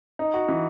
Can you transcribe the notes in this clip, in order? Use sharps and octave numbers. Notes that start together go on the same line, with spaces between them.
D#4
F#4
E3